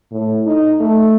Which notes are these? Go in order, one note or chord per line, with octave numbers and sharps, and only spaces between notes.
A2
D#4
A3